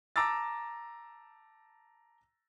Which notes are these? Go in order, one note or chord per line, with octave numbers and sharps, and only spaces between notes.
A5 A#5 D6 E6 A6